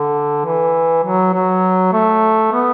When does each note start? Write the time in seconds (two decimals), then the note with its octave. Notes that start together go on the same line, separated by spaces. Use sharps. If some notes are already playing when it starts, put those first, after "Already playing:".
Already playing: D3
0.45 E3
1.04 F#3
1.33 F#3
1.93 A3
2.52 B3